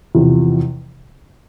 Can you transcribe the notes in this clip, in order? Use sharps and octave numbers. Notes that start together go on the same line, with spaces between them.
E2 C3 F3